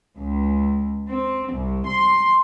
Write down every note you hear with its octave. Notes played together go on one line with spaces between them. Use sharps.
C#2
C4
C2
C6